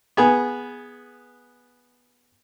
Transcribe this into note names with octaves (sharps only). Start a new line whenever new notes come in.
B3 G#4